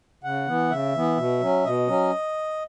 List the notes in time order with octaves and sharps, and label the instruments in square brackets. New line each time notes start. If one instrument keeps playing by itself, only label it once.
[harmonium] C#3 F#5
E3 B3
C#3 E5
E3 B3
B2
F#3 C#4
B2 D#5
F#3 C#4